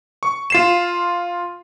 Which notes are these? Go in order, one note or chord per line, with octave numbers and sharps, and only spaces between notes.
C#6
F4 C7 E7